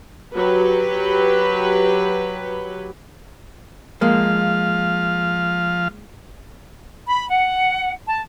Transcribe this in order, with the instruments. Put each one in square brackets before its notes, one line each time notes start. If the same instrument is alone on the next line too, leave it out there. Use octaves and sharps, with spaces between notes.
[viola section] F#3 G4 B4
[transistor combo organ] F3 F5 [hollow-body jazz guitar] G#3 A#3
[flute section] B5
F#5
A5